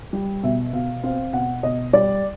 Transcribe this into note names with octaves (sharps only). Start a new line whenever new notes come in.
G3
B2 E5
B2 F5
C4 F5
B2 F#5
B2 D#5
G3 D5